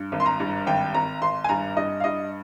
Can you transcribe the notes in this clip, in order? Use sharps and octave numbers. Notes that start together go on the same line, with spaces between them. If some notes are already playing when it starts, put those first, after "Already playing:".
Already playing: G2
G#1
C6
A#5
G2
G#1 G5
G#1 A#5
G#1 C6
G#5
G2 A#5
G2 D#5
F5
G2 D#5